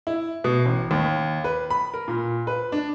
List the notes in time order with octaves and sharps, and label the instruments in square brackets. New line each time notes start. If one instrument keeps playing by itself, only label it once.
[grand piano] E4
B2
A1
D#2
B4
B5
A#4
A#2
B4
D4